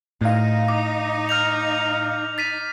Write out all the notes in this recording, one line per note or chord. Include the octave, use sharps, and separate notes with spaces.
A2 D#4 F5
D6
F6 G6 F7
A6 B6 D#7